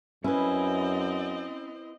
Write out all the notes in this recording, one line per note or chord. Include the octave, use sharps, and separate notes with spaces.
F#2 C4 C#4 E4 B4 D#5